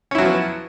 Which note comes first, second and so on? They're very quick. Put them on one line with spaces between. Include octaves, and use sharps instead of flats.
C#4 E4 F#3 F3 B3